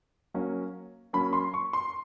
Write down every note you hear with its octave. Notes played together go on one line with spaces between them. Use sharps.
F#3 A#3 C#4
F#3 A#3 C#4 B5
C6
C#6
C6